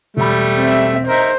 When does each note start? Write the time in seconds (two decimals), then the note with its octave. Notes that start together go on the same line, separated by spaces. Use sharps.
0.17 E1 G3 A3 B5
0.58 C4 E5
1.08 D#4 A#4 C5 E5